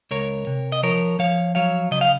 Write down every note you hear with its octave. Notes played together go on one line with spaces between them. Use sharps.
C#2 A#4 C#5
C3
D#5
F3 A#4 C#5
F3 C#5 F5
F#3 C#5 F5
C#3 D#5
F5